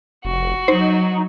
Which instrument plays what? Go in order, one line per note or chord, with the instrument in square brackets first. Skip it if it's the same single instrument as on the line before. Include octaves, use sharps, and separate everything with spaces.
[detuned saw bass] F1 [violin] F#4
[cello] F#3 [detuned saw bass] D#4 [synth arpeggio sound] C5